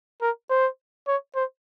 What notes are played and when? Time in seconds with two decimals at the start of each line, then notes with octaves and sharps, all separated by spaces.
0.22 A#4
0.50 C5
1.08 C#5
1.36 C5